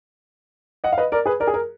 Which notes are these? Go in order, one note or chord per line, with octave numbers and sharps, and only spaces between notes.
D#5 F#5
F5
B4 D#5
A#4 D5
G#4 B4
A#4 D5
G#4
A#4